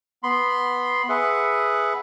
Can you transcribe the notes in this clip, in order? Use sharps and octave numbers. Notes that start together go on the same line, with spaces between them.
B3 B5 C6
G#4 B4 E5 F#5